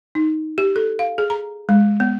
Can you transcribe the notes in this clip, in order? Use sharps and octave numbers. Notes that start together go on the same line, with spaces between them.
D#4
G4
A4
F5
G#4
A#5
G#3
B3